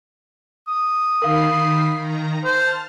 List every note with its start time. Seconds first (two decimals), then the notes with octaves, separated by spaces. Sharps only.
0.68 D#6
1.22 D#3 A#4 F5 B5 C7
1.98 D#3 A#5
2.44 C5 A5 F6